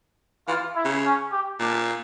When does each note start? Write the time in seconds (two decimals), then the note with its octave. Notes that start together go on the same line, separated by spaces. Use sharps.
0.48 E3 F4
0.76 E4
0.85 C#3
1.05 C#4
1.32 G4
1.60 A#2 D4